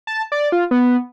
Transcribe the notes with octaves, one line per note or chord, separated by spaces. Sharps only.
A5
D5
F4
B3